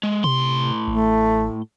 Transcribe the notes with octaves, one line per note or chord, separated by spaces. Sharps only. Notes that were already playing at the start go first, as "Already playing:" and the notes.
G#3
A2 C3 C6
A1 A3